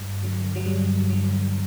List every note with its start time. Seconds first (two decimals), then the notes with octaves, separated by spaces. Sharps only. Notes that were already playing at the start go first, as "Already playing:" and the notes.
Already playing: G2
0.23 D3 F#3
0.56 F#3
0.66 G2 G3
1.10 D3 F#3